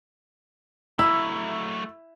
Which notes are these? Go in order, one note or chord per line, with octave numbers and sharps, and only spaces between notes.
F#3 A3 E4 E6